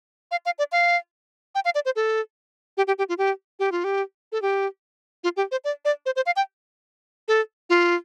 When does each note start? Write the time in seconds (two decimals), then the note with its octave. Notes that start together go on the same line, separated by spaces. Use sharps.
0.31 F5
0.46 F5
0.59 D5
0.72 F5
1.55 G5
1.65 F5
1.75 D5
1.85 C5
1.96 A4
2.77 G4
2.87 G4
2.98 G4
3.09 F4
3.18 G4
3.59 G4
3.72 F4
3.84 G4
4.32 A4
4.42 G4
5.24 F4
5.37 G4
5.51 C5
5.65 D5
5.85 D5
6.06 C5
6.16 C5
6.26 F5
6.36 G5
7.28 A4
7.70 F4